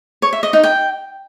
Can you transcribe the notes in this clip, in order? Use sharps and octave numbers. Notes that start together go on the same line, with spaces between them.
C#5
E5
D#5
D#4
G5